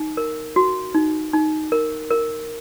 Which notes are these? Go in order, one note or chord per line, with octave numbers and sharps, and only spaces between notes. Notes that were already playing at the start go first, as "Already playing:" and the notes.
Already playing: D#4
A#4
F#4
D#4
D#4
A#4
A#4